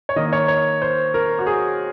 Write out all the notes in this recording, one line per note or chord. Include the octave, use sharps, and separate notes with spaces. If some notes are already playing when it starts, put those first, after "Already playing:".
C#5
D#3 A#3 D#5
C#5
C#5
C5
A#4
F#4
G#4